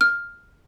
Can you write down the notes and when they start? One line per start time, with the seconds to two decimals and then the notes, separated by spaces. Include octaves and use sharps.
0.01 F6